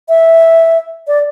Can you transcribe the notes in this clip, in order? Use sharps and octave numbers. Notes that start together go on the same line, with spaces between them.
E5
D5